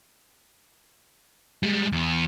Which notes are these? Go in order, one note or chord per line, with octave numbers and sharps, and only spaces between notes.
G3 G#3
E2 B3